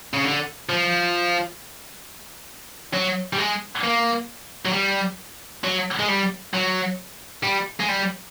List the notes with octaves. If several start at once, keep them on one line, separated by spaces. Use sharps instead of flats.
C#3
D3
F3
F#3
G3
G#3
A#3
F#3
G3
F#3
G#3
G3
F#3
G3
G#3
G3